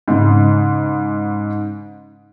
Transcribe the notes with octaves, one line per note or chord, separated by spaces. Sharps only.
G#2 C#3